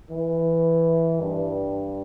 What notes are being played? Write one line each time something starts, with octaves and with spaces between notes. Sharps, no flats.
E3
G2